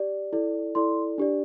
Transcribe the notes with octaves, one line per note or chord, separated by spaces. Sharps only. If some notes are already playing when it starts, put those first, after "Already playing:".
Already playing: G4 D5
E4 A4 D5
E4 A4 D5 C6
D4 G4 D5